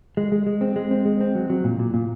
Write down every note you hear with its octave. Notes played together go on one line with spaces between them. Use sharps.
G#3
G#3
G#3
C4
G#3
C4
G#3
C4
F#3
F#3
A#2
A#2
A#2